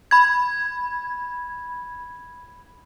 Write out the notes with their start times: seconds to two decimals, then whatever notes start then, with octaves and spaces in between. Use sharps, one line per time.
0.11 B5 G#6